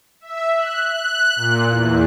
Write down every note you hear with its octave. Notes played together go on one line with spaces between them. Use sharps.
E5
F#6
F#6
A#2
E2